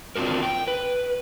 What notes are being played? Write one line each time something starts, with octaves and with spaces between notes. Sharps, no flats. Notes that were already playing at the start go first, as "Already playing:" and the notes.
C4 D4 F4 F#4 A#4
G5
B4